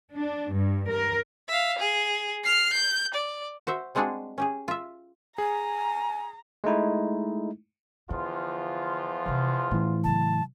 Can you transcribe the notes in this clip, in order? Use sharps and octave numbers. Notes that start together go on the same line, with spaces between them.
D4
G2
A#4
E5 F5
G#4
F6 C7
G6
D5
F#4 C5 E5
G3 G#3 C4 D4 F#4 G#4
C#4 G4 G#4
F4 E5
G#4 G#5 A#5
G#3 A3 D#4 E4
E2 D3 F3 F4
C3 E3
A2 E3 C#4 E4
C#3 F#3 A5